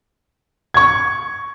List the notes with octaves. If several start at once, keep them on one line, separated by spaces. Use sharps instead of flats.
C#6 G#6